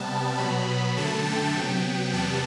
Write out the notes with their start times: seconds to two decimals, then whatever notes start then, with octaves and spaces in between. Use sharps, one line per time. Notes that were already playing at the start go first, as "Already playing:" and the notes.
Already playing: C3 G3 B3 A5
0.38 B2 F#3 B3 B5
0.67 B5
0.97 F#2 D3 A3 A5
1.25 G5
1.55 C3 F#3 B3
2.13 E2 C3 G3 B3 A5